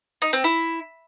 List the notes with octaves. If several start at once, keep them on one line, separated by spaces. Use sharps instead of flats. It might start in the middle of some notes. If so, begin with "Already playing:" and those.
D#4
C4
E4